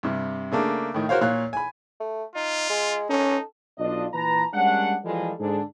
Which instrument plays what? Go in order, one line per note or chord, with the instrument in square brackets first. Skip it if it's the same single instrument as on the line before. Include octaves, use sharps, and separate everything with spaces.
[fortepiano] G2 C3
C#3 A3 A#3 D4
A2 D#3
F#4 A#4 C5 C#5 F5
A#2 C#5 F5 F#6
G#5 B5
[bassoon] A3
[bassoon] D#4 [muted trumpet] F4
[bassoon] G#3
[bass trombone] C#4 [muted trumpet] D#4 [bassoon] A4
[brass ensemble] B1 D4 F4 D#5
A#2 E3 B4 A5 A#5
G3 G#3 A#3 C#4 D4 F#5
E3 F3 G3 G#3 F4 A4
G#2 D3 D4 G#4